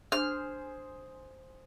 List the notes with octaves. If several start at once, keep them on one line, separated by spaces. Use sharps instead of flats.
D4 G#4 C5 F6